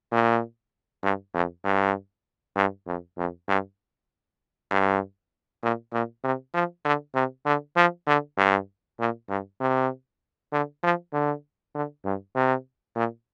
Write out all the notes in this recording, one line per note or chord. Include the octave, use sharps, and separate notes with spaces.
A#2
G2
F2
G2
G2
F2
F2
G2
G2
A#2
A#2
C3
F3
D3
C3
D3
F3
D3
G2
A#2
G2
C3
D3
F3
D3
D3
G2
C3
A#2